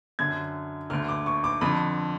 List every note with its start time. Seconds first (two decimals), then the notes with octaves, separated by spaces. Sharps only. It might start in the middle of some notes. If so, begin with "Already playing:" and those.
0.19 F#2 D3 G#6
0.90 D2 D3 F6
1.08 D6
1.26 C#6
1.44 D6
1.61 F2 D3 B5